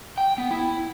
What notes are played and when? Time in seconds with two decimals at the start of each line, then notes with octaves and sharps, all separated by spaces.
0.18 G5
0.38 B3
0.51 E4